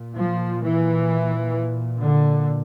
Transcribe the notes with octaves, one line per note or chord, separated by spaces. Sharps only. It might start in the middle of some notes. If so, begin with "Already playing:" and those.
Already playing: A#2
F3
E3
D3